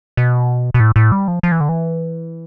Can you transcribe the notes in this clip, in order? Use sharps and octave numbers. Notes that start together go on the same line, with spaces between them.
B2
B2
A2
A2
G3
F3
F3
E3
D3
E3